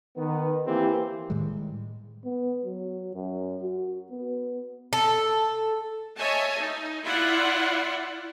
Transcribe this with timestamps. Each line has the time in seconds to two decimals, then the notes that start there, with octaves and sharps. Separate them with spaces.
0.17 D#3 B3
0.67 E3 A#3 C4 G4
1.30 A2 D#3 G3 G#3
2.25 B3
2.65 F#3
3.15 F#2
3.63 F#4
4.11 B3
4.93 A4
6.17 C#5 D#5 E5 G#5 A5
6.59 D#4
7.06 E4 F4 D5 F#5